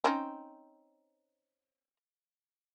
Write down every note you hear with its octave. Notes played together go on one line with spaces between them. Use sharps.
C4 C#4 D#4